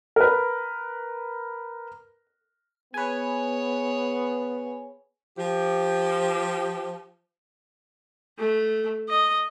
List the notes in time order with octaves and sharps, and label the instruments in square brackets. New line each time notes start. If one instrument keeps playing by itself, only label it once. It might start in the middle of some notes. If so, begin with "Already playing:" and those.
[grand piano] A#4 B4
[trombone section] B3 [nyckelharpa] G#4 C#5 [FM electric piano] B4 G#5
[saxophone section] F3 G4
[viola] A3
D#5